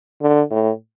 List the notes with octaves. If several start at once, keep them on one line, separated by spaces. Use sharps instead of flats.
D3
A2